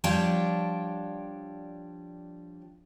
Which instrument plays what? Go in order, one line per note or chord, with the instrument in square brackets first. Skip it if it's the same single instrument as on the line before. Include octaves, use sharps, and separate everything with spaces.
[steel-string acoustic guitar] F3 G3 D4 C#5 G5 A5